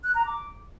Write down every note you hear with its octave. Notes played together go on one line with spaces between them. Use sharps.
F#6
A#5
D6